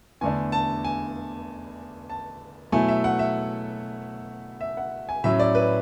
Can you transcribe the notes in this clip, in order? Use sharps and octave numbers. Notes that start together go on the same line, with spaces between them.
E2 D3 A3 D4 G#5
A5
G#5
A5
B2 F#3 A3 E4 G#5
E5
F#5
E5
E5
F#5
G#5
A2 F#3 C#4 E5
D5
B4